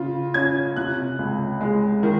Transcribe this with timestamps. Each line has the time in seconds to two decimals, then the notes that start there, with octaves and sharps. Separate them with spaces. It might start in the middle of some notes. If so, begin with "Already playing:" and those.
Already playing: C#3 F4
0.34 C#4 G#6
0.76 C3 F#6
1.19 C#2
1.61 G#3
2.03 D#3